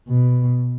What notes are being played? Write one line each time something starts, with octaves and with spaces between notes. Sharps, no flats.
B2